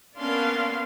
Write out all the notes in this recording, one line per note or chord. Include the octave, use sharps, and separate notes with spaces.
A#3 B3 C#4 D4 F5 C6